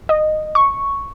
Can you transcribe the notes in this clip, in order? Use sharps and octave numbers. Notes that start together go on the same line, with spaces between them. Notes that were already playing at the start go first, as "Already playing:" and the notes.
D#5
C#6